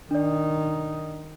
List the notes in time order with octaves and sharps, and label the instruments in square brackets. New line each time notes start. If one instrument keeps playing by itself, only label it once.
[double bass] D#3 D#4 [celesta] D4 D5